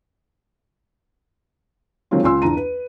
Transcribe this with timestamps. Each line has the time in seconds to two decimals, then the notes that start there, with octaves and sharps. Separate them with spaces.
2.11 D3 D#3 F#3 G#3 C4 F4
2.24 C#2 G#5 C6 E6
2.42 E2 D4 A#5 D#7
2.57 B4